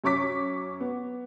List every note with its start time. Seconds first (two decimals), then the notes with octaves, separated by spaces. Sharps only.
0.04 F#2 C#5 C#6 D6 B6
0.80 B3